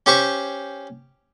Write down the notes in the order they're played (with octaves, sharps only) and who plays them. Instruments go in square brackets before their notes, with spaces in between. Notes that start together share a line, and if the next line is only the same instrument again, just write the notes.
[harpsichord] C#4 G4 C5 C#6